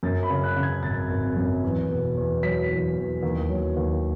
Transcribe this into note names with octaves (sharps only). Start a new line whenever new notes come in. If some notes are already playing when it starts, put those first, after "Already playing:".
F#2 A6
B5
C#3
F#6
C#3
G#6
G#1 A6
G#1
F#2
E2
B2
E2
F#3 B6
E2
E2
D#2
F#3
D#2